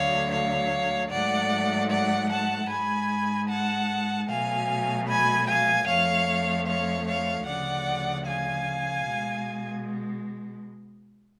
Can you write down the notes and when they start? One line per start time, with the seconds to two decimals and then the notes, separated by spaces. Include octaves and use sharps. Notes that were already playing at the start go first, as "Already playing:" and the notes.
Already playing: D2 D3 F#3 A3 C#5 F5
0.30 C#5 F5
1.10 G#2 F#3 A3 D5 F#5
1.90 D5 F#5
2.30 F#5 A5
2.69 G#2 G#3 G#5 B5
3.48 F#5 A5
4.28 B2 F#3 A3 F5 G#5
5.07 G#5 B5
5.47 F5 G#5
5.87 F2 F3 A3 C#5 F5
6.66 C#5 F5
7.07 C#5 F5
7.46 D2 C#3 F3 D5 F#5
8.25 F5 G#5
9.05 B2 G#3